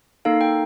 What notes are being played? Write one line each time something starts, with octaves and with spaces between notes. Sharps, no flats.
A#3 D#4 A4 F5
G5